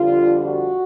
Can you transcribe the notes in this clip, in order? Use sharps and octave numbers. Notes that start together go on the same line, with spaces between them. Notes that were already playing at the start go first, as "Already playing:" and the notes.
Already playing: F2 D3 G3 F4
F#4